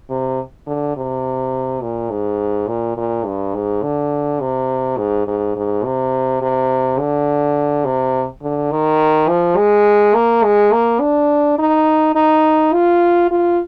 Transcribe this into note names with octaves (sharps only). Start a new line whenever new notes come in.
C3
D3
C3
A#2
G#2
A#2
A#2
G2
G#2
D3
C3
G#2
G#2
G#2
C3
C3
D3
C3
D3
D#3
F3
G#3
A#3
G#3
A#3
D4
D#4
D#4
F4
F4